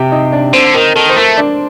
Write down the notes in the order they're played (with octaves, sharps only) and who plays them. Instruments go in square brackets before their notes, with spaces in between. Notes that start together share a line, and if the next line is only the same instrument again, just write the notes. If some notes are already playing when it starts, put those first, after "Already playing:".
Already playing: [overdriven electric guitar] C3 [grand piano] G4 G5
[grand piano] D#4 D#5
D4 D5
[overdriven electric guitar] D3 [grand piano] C4 C5
[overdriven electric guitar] D#3 [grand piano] A#4
[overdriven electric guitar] D#3 [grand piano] A4
[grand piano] C5
[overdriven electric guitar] A3 [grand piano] A#4
[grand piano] D4 D5